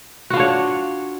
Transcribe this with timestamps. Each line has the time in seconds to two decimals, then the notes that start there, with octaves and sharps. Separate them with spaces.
0.30 F#4
0.33 F4
0.37 D4
0.40 C#5